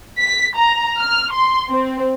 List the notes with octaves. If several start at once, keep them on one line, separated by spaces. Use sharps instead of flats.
B6
A#5
F6
C6
C4